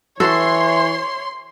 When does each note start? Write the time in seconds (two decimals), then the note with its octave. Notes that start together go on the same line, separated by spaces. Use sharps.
0.20 E3 F#4 A4 C#5 C6